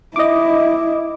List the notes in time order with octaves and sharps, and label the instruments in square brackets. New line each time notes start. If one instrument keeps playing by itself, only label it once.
[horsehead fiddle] E4 [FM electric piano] D#5 D6